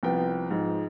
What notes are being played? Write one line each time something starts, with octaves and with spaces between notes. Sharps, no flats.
C2 F3 B3 G5
G#2 F3